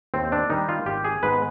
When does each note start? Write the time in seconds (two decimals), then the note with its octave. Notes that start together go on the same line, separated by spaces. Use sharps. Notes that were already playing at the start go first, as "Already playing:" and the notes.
0.14 D#2 C4
0.32 D4
0.50 D#3 G3 D#4
0.69 F4
0.86 G#1 G4
1.05 G#4
1.23 G#2 D#3 G#3 B3 B4